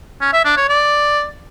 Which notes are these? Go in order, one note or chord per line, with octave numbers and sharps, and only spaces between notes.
C#4
E5
D4
C#5
D5